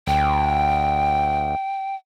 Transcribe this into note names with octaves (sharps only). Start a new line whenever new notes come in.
D2 G5